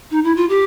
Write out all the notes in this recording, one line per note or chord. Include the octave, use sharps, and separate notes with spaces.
D#4
E4
F4
G4